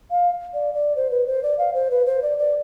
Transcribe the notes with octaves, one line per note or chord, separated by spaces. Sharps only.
F5
D5
D5
C5
B4
C5
D5
F5
C5
B4
C5
D5
D5